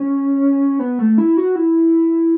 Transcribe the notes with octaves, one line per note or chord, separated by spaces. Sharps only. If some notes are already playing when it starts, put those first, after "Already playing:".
Already playing: C#4
B3
A3
E4
F#4
E4